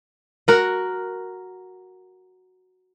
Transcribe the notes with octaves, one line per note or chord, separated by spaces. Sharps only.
F#4 A#4 F#5